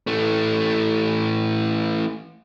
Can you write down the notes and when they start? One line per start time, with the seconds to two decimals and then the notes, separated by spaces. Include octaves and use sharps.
0.07 E3 A3